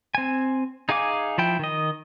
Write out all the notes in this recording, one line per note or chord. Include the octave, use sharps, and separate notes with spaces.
C4 G#5
D#4 G#4 F5 G#5 D6
F3 E4 G5
D#3 D#5